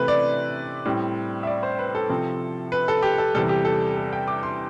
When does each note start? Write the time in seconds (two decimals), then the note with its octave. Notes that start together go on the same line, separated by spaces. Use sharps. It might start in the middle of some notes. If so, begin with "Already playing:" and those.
Already playing: C3 E3 A3 C4 E4 B4
0.08 D5
0.85 A2 G3 C4
1.43 E5
1.47 D5
1.63 C5
1.79 B4
1.95 A4
2.09 C3 F3 C4
2.72 B4
2.88 A4
3.03 G4
3.18 A4
3.35 E2 C3 G3 A4
3.49 G4
3.65 A4
3.97 A4
4.13 G5
4.28 D6
4.43 C6